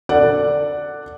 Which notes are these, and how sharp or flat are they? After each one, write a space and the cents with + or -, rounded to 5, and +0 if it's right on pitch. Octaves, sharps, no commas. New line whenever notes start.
A4 +25 D5 +0 F#5 +0